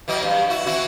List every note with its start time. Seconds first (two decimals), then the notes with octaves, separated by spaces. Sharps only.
0.08 E3 F#3 D#5
0.23 G2
0.50 E4 F#4
0.66 E3 E4 F#4